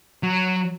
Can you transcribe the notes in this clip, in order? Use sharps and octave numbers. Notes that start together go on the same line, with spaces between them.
F#3